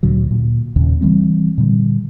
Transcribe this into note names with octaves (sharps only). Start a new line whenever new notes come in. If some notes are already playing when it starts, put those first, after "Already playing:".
D2 A#2 D3 F#3
A#2
D#2 A#2 C#3
E3 F3 G3 C4
A#2 D3 G3